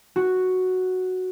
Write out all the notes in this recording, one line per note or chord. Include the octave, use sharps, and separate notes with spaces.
F#4